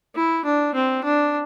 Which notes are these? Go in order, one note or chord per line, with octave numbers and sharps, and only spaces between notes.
E4
D4
C4
D4